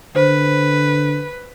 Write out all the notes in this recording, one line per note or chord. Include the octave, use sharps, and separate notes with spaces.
D3 B4 C5